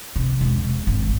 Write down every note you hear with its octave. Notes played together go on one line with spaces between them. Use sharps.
C3
E1
G#1